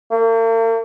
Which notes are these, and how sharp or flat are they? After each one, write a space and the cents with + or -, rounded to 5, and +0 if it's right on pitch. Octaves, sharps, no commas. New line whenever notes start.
A#3 -45